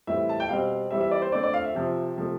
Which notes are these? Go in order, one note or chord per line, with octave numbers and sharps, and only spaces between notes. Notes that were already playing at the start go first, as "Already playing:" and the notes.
A2 E3 G3 C4 E5
A5
G5
B2 G3 C4 F5
E3 G3 C4 E5
E5
D5
C5
D3 A3 C4 D5
D5
F5
E5
C3 F3 C4
C3 F3 A3